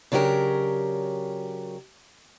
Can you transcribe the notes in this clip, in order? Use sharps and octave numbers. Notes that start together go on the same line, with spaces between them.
C#3 F#3 D4 G4 A#4